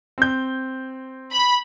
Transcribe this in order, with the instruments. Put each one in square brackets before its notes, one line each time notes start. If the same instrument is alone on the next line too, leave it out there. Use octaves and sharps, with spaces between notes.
[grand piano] C4 G6
[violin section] B5